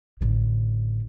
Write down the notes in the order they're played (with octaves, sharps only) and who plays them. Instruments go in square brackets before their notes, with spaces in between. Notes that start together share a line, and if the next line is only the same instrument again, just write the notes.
[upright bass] A1 D3